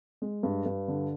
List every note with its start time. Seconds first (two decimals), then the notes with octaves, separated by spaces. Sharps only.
0.22 G#3
0.43 G2
0.66 G2
0.88 D3